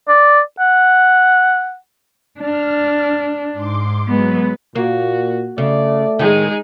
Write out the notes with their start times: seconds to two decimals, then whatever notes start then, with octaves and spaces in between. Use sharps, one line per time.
0.09 D5
0.60 F#5
2.40 D4 F6
3.53 G#2 C6 D6
4.08 F#3 G#3 B3 B4
4.76 A#2 A#3 F#4
5.58 C#3 A3 D5
6.19 A2 D#3 G#3 D#4 G#4